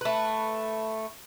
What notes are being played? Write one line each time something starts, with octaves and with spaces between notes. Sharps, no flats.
A3 B4